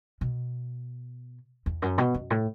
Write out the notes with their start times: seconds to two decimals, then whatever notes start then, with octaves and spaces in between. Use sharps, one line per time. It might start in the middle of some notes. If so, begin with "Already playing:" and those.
0.21 B2
1.66 E2
1.82 F#2
1.98 B2
2.14 F#2
2.30 A2